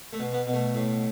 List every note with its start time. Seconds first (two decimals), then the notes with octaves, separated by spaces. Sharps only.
0.13 A3
0.19 B2
0.33 B3
0.47 B2
0.54 A3
0.74 A2